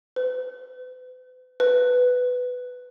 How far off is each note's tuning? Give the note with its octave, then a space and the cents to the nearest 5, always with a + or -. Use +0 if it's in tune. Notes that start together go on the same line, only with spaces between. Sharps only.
B4 +45
B4 +10